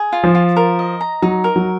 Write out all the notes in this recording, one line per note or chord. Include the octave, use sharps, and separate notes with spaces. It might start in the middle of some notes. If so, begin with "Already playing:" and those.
Already playing: G#4
F4
F3
F4
A#4
D#5
A#5
F#3 D#4
A#4
F#3